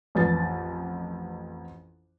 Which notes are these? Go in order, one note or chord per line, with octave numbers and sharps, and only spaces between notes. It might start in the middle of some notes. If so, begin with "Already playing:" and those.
A1 F2 B4 A6